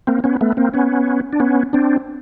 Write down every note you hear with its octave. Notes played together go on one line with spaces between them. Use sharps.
A#3 C4
B3 C#4
A3 B3
A#3 C4
B3 C#4
D4
B3 C#4
C4 D4